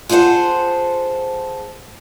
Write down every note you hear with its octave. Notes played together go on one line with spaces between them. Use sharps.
F4 G#4 A4 C5 F#5